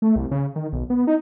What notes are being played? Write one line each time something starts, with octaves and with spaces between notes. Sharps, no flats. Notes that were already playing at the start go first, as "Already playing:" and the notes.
A3
C2
C#3
D#3
B1
B3
D#4